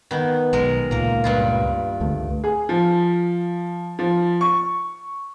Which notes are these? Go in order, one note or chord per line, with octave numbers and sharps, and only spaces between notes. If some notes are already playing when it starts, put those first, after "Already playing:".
D#3 B3
B1 G#3 A#4
C#2 A#2 A#3 A#4
G2 E4 F4
C#2 D3 A3
G#4
F3
F3
C#6